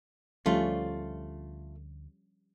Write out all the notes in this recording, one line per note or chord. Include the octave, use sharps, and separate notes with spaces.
D2 F3 G3 A3 C#4 F4